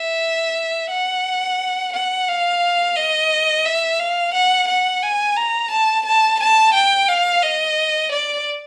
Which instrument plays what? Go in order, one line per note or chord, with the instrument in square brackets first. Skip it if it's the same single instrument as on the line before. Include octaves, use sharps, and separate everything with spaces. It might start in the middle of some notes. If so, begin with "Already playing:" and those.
Already playing: [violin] E5
F#5
F#5
F5
D#5
E5
F5
F#5
F#5
G#5
A#5
A5
A5
A5
G5
F5
D#5
D5